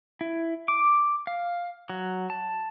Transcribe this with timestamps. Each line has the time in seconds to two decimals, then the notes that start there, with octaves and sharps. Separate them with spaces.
0.21 E4
0.68 D6
1.27 F5
1.90 F#3
2.30 A5